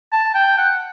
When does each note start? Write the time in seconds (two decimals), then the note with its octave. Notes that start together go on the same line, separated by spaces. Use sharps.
0.12 A5
0.35 G5
0.58 F#5